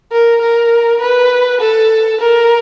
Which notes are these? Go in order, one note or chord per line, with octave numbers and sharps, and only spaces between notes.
A#4
A#4
B4
A4
A#4